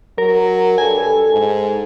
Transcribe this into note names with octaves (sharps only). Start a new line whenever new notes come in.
F#3 A#4
G2 A4 G#5
G#2